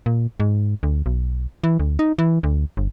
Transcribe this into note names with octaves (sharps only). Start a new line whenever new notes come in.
A#2
G#2
D2
B1
E3
D2
D#4
E3
D2
G1